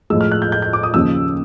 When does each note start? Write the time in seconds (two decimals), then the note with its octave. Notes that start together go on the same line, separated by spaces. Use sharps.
0.10 A2 F3 G#3 E6
0.21 F6
0.32 F#6
0.42 G6
0.52 G6
0.62 G6
0.73 D6
0.83 D#6
0.94 D#2 C#3 F3 E6